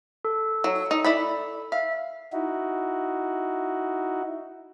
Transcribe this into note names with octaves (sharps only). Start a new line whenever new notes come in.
A4
F#3
D#4
E4 D5 B5
E5 F5
D#4 E4 F#4